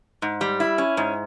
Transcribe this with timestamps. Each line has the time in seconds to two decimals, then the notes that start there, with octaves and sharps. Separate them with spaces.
0.22 G#2
0.41 G3
0.60 E4
0.78 C#4
0.97 G#2